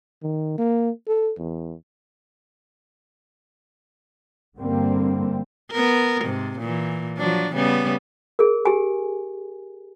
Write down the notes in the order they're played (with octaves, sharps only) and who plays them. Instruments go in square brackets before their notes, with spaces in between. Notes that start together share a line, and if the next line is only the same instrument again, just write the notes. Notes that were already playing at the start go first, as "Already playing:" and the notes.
[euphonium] D#3
A#3
A4
E2
[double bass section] G2 D3 G3 A#3 C4
[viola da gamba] B3 A#4
G#2 C3
A#2 E3
F3 F#3 D4
C#3 G3 B3
[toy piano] G#4 A#4
G4 G#5